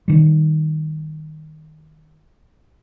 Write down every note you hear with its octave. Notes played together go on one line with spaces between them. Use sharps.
D#3 G3